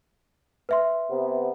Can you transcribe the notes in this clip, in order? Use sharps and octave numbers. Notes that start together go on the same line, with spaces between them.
B4 E5 C6
C3 B3